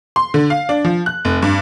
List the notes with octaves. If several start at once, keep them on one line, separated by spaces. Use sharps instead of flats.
C6
D3
F5
D4
F3
F#6
F1
G2